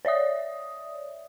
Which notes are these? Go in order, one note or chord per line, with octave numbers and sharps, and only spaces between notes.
C#5 D5 E5 D#6